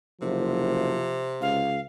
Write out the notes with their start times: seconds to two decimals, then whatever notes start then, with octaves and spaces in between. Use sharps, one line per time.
0.22 F#1 C3 F3
1.42 C#2 F5